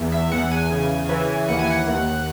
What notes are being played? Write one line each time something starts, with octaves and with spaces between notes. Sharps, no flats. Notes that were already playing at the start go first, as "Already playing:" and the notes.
Already playing: E2
E5
E2 F#5
G#5
C#3
E3
D#2 F#5
G#5
F#5
D#2